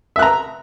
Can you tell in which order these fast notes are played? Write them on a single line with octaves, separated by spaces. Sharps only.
E5 F#6 A#5